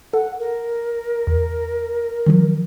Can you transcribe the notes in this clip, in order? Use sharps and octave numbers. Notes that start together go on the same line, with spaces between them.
A4 F#5
A#4
E2
D#3 F3 F#3